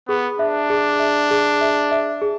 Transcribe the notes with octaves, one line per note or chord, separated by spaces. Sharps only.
B3 G#4
D4 E5
G#4
E5
G#4
E5
E5
G#4